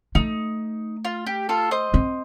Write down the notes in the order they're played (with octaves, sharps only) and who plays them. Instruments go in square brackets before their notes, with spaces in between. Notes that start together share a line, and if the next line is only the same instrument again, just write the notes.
[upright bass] A3 [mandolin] D#4
[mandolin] F4
G4
F4 A4
C5 D#5
[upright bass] C4